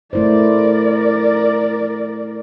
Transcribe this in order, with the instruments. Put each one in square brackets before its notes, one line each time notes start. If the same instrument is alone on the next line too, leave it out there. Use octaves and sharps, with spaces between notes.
[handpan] A3 E4 C5 [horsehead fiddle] A#4 D5